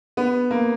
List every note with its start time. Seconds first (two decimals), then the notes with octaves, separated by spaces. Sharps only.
0.17 B3
0.51 A#3